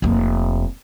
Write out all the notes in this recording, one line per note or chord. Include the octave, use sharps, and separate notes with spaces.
F1 A#3